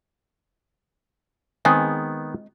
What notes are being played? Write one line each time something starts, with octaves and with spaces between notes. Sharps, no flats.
D#3 G#3 B3 C4 G#4